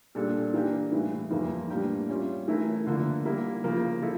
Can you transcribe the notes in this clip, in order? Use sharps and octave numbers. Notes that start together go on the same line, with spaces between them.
A#2 G3 D4 A4
E3 A#3 D4 G4
A2 E3 G3
F2 E3 G3 A#3
A2 G3 A#3 D4 G4
G3 C#4 F4
E3 A3 E4 A#4
D3 F3 A#3 E4
G3 A#3 E4
C#3 F3 A#3
F3 E4 A4